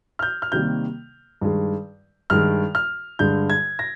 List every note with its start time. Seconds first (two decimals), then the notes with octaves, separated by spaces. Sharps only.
0.19 F6
0.23 G6
0.42 F6
0.52 C3 D#3 G3 A#3 G6
1.41 G2 D#3 G#3
2.30 G2 D#3 G#3 F6
2.75 F6
3.19 G2 D3 G#3 G6
3.50 G#6
3.79 A#6